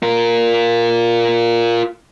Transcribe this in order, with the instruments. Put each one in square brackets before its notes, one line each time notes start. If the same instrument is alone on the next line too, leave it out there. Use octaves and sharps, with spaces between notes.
[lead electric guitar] F4 A#4